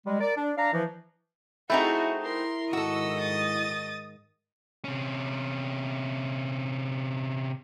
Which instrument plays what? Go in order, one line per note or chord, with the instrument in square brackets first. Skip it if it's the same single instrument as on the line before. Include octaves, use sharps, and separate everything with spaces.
[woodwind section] G3 G#3
A#4 D5
D4
D4 D5 F5 A#5
E3 F3
[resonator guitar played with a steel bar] A3 C4 D#4 [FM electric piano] E4 [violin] F#4 G#4
[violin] A#4 C6
[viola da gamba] G#2 D#3 D#5 [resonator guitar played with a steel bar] F#4 A4 [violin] E6
[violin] D#6 A6
[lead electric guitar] C3 C#4